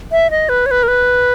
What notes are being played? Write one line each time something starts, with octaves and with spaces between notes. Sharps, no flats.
E5
D#5
B4
C#5
B4
A#4
B4